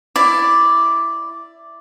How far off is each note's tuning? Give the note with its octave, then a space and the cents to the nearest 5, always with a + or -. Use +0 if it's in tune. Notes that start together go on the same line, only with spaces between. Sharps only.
E4 +10 D5 +0